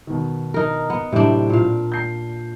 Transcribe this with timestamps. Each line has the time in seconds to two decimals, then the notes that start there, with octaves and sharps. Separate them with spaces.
0.07 B2 D#3
0.54 D#4 A#4
0.90 B3
1.12 A2 C3 F#3 D4
1.50 A#2 F5
1.92 G6 C7